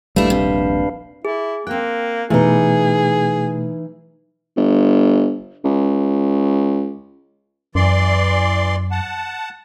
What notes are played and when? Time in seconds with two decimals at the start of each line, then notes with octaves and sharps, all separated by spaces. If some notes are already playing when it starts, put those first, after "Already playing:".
0.16 D#1 A#1 G3 A3 D4 E4 B4 F5
0.30 C3
1.25 E4 G#4
1.67 A#3 C4 G5 F#6
2.30 B2 E3 A3 D#4 E4 G#4 B4
4.57 G1
5.64 C#2
7.75 F#2 E3 D5 C6
8.91 F#5 A5